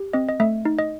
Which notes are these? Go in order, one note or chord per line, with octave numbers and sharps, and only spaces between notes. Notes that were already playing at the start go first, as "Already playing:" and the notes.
Already playing: G4
C4 D#5
D#5
A3 E5
D#4
D#5